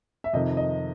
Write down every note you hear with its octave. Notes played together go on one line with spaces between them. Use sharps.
E5
F2 C3 D#3 D#5
D#5